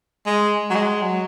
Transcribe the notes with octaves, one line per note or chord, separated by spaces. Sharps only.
G#3
F#3
G#3
F#3